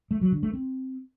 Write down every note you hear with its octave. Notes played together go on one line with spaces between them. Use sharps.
A3
F#3
D3
A3
C4